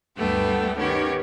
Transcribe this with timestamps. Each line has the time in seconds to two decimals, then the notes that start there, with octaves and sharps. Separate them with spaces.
0.17 D2 G2 G3 A3 B3 G5
0.78 D#3 B3 C#4 G4 C#5